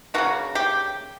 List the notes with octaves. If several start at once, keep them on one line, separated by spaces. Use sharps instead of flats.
C#3 F3 A#3 F#4
G4